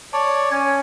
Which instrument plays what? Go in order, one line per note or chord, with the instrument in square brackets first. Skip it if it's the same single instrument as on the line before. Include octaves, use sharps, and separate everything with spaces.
[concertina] C#5 D5 [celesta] A5
[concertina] C#4 [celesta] G#6